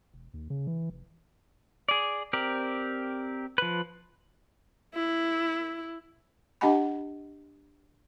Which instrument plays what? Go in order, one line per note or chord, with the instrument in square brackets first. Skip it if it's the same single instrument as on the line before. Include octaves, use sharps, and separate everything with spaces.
[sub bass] E1
D#2
C#3
E3
F1
[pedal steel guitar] G#4 D5
C4 G4 A#4 D5
F3 B4
[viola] E4
[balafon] D4 G4 D#5 F#5 G#5 B5